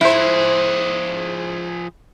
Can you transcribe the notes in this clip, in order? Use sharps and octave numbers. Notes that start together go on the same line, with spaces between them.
G#2 F3 E4 G#4 C5